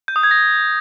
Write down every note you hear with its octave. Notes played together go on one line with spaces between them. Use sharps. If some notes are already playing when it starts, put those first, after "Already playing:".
G6
D#6
G#6
A#6